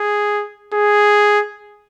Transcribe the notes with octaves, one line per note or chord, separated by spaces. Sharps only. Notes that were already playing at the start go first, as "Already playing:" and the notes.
Already playing: G#4
G#4